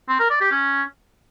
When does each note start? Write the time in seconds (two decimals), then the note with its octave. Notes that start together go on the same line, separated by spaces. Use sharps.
0.09 C4
0.19 A#4
0.30 D5
0.41 G4
0.52 C#4